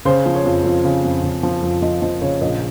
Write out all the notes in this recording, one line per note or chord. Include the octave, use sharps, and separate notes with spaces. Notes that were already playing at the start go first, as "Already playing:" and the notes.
C#3 C5
F3
C#5
F2
F2
C#3
F2
C#3
F3
F2
F3 D#5
F3 D#5
C#3 C#5
A#1 D#5